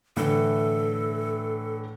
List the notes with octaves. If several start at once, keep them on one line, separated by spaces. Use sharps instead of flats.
A2 D3 E3 A4